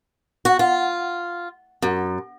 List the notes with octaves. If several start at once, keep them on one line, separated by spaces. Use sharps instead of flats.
F#4
F4
F#2